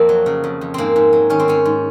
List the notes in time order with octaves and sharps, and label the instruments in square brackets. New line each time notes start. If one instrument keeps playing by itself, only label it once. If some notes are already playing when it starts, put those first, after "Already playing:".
Already playing: [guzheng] F2 A#3 C4
F#3
C#3
F2
F2
G#2 A#3 C4
G#2
F#3
D#3 C#4
C4
G#2 C#4
G#2